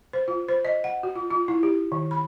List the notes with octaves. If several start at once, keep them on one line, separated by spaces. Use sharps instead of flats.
C5
F4
C5
D#5
F#5
F#4
F4
F4
E4
G4
D#3
B5